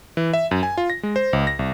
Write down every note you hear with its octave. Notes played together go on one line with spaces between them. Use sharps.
E3
E5
F#2
G#5
F4
A#6
G#3
C5
C#2
A#6
C2